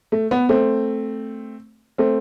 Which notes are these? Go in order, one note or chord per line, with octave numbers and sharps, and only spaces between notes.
A3
B3
A3 C4
A3 C4